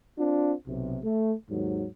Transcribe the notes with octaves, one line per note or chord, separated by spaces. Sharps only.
C4 D4 F4
B1 C3
A3
D#2 G#2 D#3 F#3